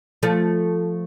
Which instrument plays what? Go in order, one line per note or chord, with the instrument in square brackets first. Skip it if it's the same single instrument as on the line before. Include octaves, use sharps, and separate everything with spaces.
[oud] F3 A3